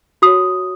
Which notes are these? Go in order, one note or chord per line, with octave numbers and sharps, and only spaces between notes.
F#4 C#5 D#6